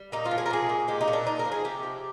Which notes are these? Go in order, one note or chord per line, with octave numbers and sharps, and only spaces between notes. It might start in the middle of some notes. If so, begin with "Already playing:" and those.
Already playing: G3
A#2 D#4
F4
F3
G#4
A#4
A#2 G#4
A#2
G#3 G4
D#4
A#2
D4
A#2 D#4
A#4
F3
G#4
C3 G4
F3